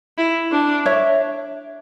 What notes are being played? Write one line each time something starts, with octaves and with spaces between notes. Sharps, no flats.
E4
D4
C#5 E5